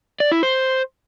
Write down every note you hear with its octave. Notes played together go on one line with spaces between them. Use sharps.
D5
E4
C5